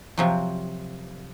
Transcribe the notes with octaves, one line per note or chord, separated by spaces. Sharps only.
C3 F3 F#3